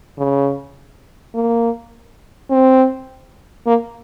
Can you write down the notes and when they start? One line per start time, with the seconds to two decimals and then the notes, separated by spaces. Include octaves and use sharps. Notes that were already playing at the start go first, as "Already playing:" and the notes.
0.18 C#3
1.35 A#3
2.50 C4
3.66 A#3